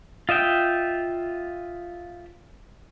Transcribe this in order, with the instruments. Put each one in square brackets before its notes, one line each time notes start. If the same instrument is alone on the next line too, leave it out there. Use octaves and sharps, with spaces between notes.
[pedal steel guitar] F4 D#5 E5 G5